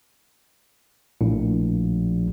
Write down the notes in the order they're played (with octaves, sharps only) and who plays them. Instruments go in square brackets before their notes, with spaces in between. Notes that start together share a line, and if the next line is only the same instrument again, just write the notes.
[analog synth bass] A#1 [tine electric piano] A2